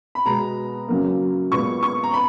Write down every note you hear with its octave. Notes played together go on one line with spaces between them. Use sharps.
B5
B2 G#3 B3 A#5
F#2 C#3 F#3 A#3
A#2 G#3 B3 C#6
C#6
A#5
B3 B5